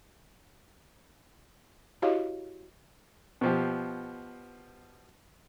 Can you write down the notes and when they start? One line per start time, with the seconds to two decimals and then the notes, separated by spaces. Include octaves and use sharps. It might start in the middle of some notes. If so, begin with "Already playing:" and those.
2.02 E4 F#4 G4 C#5 D#5 F5
3.41 B2 F3 G4